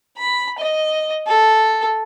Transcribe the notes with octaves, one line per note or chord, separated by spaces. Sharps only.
B5
D#5
A4